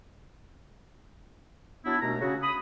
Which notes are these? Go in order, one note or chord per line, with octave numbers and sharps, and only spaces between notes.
F#3 B3 D4 E4
D#2 B2 A3 D4 A#5
C#3 C#4 F#4
B5 D#6